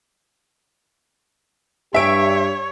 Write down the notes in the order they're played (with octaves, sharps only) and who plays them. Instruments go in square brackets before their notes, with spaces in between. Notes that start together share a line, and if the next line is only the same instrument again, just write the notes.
[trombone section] G2 G4 [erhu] C#5 [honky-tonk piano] E5 D7